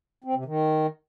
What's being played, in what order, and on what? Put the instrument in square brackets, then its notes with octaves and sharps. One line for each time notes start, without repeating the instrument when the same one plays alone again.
[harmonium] C4
C3
D#3